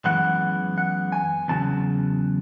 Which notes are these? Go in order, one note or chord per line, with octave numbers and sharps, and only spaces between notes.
F#2 E3 G#3 B3 F#5
F#5
G#5
E2 C#3 F#3 A5